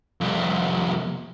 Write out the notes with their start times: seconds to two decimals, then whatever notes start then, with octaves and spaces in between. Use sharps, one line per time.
0.21 C2 F2